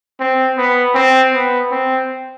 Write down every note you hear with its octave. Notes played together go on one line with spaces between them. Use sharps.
C4
B3
C4
B3
C4